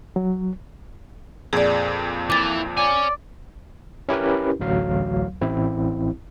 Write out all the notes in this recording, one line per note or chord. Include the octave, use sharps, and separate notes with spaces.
F#3
F2 A#2 G#4 D5
E3 D6 A6
C#5 D5 G#5
C#4 E4 G4 A#4 B4
A1 D2 F#3 F5
A1 C4 E4